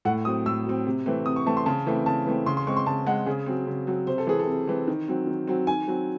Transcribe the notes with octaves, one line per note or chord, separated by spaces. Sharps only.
A2 F#5
F#3 C4 D#6
A2 E6
F#3 C4
C3
E3 A3 C4
C3 D#6
C#6
E3 A3 C4 A5
C6
C#3 A5
E3 A3 C4
C#3 A5
E3 A3 C4
C#3 C6
C6
G#3 C4 C#6
C6
C#3 A5
G#3 C4 F#5
C#3 G#4
F#3 C4
C#3
F#3 C4
C3 C5
A4
E3 C4 G#4
A4
C3
E3 C4
D#3
F#3 C4
D#3
F#3 C4
D#3 G#5
F#3 C4